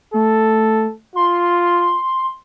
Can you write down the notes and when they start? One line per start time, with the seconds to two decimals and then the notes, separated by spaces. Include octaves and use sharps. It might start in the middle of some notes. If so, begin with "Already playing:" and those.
0.14 A3 A4
1.16 F4 C6